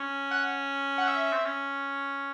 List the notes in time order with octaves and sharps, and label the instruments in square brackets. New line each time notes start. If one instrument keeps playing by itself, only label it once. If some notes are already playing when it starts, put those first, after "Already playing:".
Already playing: [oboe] C#4
[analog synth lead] F#5
F#5
E5
[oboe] C4
C#4